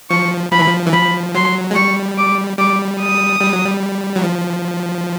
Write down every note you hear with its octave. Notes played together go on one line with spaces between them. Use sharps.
F3 C#6
F3 B5
E3
F3
E3
F3 B5
F#3 C6
G#3
G3 C#6
D6
G3 D6
D#6
G3
F#3
G3
F#3
F3